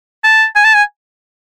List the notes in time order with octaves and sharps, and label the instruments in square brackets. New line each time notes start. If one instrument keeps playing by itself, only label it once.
[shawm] A5
G#5
A5
G#5